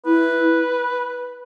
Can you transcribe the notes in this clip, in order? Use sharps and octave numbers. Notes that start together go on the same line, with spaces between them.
E4 B4